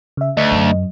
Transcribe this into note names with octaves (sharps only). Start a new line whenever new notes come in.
C#3 E5
D2 D#5
F#2